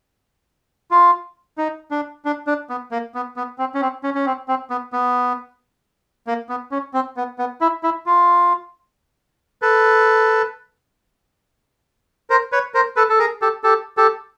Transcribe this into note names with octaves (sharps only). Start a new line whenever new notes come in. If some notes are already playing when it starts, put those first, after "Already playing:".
F4
D#4
D4
D4
D4
B3
A#3
B3
B3
C4
C#4
C4
C#4
C#4
C4
C4
B3
B3
A#3
B3
C#4
C4
B3
B3
E4
E4
F4
A4 B4
A#4 C5
B4 C#5
A#4 C5
A4 B4
A4
G#4 A#4
G4 A4
G4 A4
G4 A4